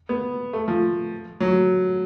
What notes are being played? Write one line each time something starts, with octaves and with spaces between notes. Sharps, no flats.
B3
A3
F3
F#3